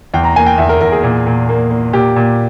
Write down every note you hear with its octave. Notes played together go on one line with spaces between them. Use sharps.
E2 G5
A#5
A#3 G#5
G5
E2 E5
A#4
E2 A#4
G#4
A#2
A#2
A#3
A#3
A#2 G4
A#2